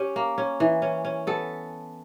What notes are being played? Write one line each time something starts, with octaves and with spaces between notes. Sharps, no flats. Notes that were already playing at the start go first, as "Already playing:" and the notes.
Already playing: C#4 G4
A#3
C#4
E3
C#4
C#4
B3 A4